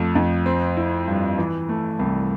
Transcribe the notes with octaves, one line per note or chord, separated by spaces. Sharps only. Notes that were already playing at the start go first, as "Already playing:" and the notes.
Already playing: F2 A3
F2
C4
E4
G2
E3
A3
C2